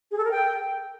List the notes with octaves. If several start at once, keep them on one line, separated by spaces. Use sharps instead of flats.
G#4
A4
A#4
G5